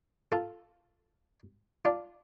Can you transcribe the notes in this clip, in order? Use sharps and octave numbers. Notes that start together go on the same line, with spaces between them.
F4 A4
D4 F4